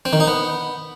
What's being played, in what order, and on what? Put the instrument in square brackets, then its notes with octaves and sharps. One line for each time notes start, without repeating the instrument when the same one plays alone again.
[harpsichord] C4
D#3
D#4
B3